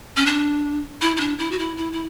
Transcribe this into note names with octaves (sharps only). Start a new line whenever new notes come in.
C#4
D4
E4
E4
D4
E4
F#4
E4
E4
E4